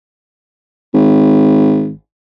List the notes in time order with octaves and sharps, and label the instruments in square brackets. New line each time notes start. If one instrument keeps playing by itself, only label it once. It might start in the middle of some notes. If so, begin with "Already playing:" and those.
[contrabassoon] G#1